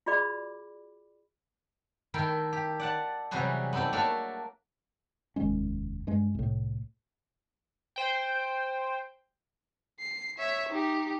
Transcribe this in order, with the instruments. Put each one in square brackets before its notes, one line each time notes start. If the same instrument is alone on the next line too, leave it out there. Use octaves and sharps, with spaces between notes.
[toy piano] F4 F#4 G#4 D5 B5 D6
[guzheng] D#3 A3 E4 A#4 G5
G4
D5 F#5 A5
C3 E3 F#3 G3 F#4 G#4
B3 C4 D#4 A4 D5
A3 A#3 D4 F#4 A4 C#5
[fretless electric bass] F1 D#2 G#3 C#4
G2 G#3
C2 A2
[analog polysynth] C5 G5
[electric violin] C7
C#5 E5
D#4 G4